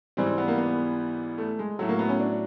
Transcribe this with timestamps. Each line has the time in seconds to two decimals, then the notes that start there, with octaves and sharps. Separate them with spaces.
0.17 G#2 E3 G3 C4
0.38 B3
0.48 A#3
0.58 B3
1.38 A3
1.59 G#3
1.79 A2 F#3 A3
1.89 A#3
1.99 B3
2.09 C#4
2.20 D4